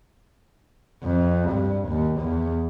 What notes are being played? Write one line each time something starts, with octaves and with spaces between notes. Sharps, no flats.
F2
G2
D#2
E2